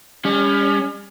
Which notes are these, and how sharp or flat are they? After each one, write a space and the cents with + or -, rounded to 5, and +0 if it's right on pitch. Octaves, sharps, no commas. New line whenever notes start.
G3 +40 C#4 +20